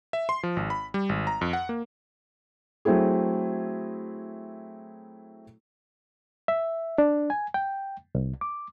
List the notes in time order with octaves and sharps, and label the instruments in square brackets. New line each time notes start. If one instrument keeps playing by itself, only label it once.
[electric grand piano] E5
C6
F3
G#1
B5
G3
G#1
A#5
F2
F#5
A#3
[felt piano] F#3 A3 C4 E4 G#4
[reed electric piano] E5
D4
G#5
G5
C2
D6